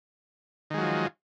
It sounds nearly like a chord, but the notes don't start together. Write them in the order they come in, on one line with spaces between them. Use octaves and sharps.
D#3 G#3 F#3 F3